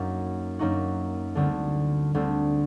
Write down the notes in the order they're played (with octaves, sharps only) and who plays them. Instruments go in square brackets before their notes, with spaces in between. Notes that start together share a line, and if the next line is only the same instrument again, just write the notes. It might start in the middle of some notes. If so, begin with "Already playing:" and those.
Already playing: [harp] F#2 F#3 A#3 D#4 F#4
F#2 F#3 A#3 D#4 F#4
D2 D3 G3 C4
D2 D3 G3 C4